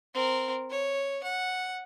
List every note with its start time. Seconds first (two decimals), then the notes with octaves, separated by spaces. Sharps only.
0.14 C4 A#4
0.70 C#5
1.23 F#5